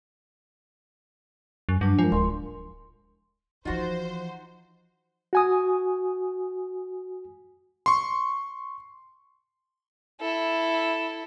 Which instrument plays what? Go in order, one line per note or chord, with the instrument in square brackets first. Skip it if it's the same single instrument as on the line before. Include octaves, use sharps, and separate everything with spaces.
[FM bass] F#2
[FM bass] G2 [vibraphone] F#3 D4
[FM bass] F3 [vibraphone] G#3 A#4
[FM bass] D1 [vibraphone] C6
[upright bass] E3 F3 [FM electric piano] D#4 F#5 [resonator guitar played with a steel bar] F4 F#4 [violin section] C5
[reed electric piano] F#4 G#5 D#6
[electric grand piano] C6 C#6
[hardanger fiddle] E4 A4